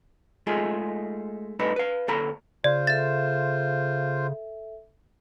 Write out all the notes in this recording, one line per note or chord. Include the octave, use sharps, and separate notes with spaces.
G#3 A3 D#4 F4 G#4
G2 A3 D#4 B4
B4 F5
D2 A#3 A4 C#5 A#5 B5
C#3 F4 C5 D5
A4 E5 A6